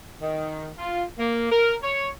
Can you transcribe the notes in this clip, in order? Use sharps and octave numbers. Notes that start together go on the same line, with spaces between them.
D#3
F4
A#3
A#4
C#5